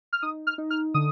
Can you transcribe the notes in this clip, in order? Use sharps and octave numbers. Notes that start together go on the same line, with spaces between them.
F6
D#4 D#6
F6
D#4
F6
D3 D#6